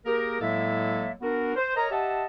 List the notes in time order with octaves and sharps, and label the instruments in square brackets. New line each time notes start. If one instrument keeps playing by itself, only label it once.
[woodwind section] A#3 G4 G#4 A#4
A2 F#3 G#3 A#3 A4 E5
B3 D4 F#4 A#4
C5
A#4 C#5 D#5 A#5
G4 D#5 E5 F#5 A5